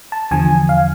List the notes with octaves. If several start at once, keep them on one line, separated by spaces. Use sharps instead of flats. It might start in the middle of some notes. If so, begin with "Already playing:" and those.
A5
E2 D3 F3 G#5
F5